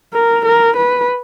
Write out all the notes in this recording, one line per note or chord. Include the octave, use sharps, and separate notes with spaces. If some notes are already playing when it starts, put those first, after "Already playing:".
A#4
A#4
B4